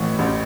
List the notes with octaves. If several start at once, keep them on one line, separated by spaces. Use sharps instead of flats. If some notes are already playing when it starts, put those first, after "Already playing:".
Already playing: A1 A2 E3 C#6
A1